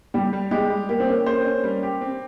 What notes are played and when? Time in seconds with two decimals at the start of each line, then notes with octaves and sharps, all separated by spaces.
0.14 G3 G4
0.33 G3
0.51 G#3 G4
0.70 G3
0.89 A#3 G4
1.00 C4
1.08 A#3 C#4
1.26 C5
1.45 C#4
1.64 G3
1.83 G4
2.01 C4